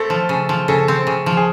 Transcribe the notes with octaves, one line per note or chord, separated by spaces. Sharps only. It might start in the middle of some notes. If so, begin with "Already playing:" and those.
Already playing: A3 C4 A4
F3
C#3
F3
C#3 A4
C4
C#3
F3
G#4